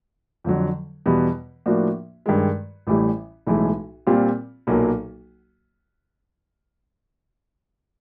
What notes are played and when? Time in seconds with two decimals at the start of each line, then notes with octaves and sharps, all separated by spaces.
0.44 F2 D3 F#3
1.06 E2 B2 G3 B3
1.66 A2 F3 A#3 D4 F#4
2.26 G2 D#3 G#3
2.87 A1 A2 E3 G3
3.47 B1 A2 E3 G#3
4.07 A#2 G3 C4 F4
4.67 B1 A#2 F#3 A#3